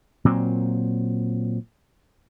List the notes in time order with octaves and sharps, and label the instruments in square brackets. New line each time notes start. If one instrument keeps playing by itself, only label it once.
[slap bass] A#2 F#3 C4